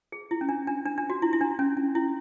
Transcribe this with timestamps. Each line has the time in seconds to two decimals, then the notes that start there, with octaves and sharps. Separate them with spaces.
0.12 G#4
0.31 E4
0.41 C#4
0.49 D4
0.67 D4
0.86 D4
0.98 D4
1.10 F#4
1.22 E4
1.33 E4
1.41 D4
1.59 C#4
1.77 C#4
1.95 E4